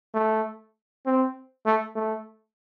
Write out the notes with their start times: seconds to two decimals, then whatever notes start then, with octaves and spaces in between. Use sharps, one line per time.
0.14 A3
1.06 C4
1.66 A3
1.96 A3